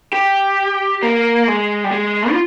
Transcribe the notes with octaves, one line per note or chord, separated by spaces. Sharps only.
G4
A#3
G#3
G3
G#3
F4